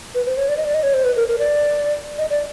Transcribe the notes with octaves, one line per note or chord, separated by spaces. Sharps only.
B4
C5
C#5
D5
D#5
D5
D#5
C#5
C5
B4
A#4
A#4
D5
D#5
D5